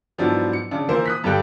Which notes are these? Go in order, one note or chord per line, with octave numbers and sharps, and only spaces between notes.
G#2 F3 F#3 B3 D4 E4
C#7
C#3 D4
E3 F3 A#3 E4 A#4 C5
D#6 F#6 B6
G2 D3 G3 G5 F#6